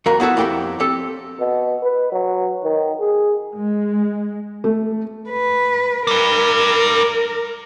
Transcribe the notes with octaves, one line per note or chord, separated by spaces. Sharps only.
F2 F#4 A#4 F5 B5
B3 E4 F#4 A4 B4
F2 E4 G4 G5 C6
C4 G4 A4
B2
B4
F#3
D#3
G#4
G#3
A3
B4
G3 A#4 B4